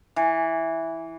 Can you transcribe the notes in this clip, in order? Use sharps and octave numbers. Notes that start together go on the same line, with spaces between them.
E3